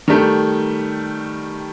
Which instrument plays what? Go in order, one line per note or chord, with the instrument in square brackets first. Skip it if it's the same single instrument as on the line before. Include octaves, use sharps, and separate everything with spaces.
[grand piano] D#3 G3 A3